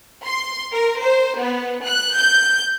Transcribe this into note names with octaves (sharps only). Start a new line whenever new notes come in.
C6
A#4
C5
B3
F#6
G6